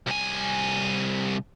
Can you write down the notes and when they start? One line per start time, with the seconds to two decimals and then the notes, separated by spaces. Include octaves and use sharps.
0.06 C2 G#5